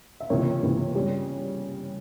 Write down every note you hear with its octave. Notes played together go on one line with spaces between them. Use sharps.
E5
C#2 C3 E3 A#3 A#4 C#5
C#2 C3 E3 A#3
C#3 G3 C#4